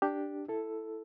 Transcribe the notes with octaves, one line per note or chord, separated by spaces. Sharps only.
D4 G4
E4 A4